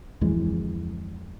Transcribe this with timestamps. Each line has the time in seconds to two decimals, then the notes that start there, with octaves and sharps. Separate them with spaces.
0.21 D1 F2 E3 G#3